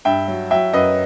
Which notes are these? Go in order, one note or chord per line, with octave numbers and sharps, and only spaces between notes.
G2 E5 G5
F#3
F#3 E5 G5
F#2 B4 D#5